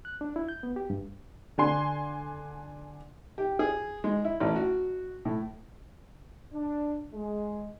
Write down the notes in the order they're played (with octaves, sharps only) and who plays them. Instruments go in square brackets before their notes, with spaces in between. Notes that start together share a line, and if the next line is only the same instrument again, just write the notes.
[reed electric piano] F#6
D4
E4
G6
B3
G4
G2
[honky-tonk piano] D3 D4 G#5 C6
[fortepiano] G4
G#4
G#3
E4
A1
F#4
A2
[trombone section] D4
G#3